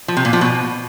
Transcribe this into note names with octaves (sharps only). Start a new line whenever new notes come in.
F3
C3
A#2
F3
B2